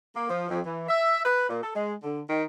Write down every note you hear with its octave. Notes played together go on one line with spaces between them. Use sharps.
A#3
F3
F2
E3
E5
B4
A#2
A4
G#3
D3
D#3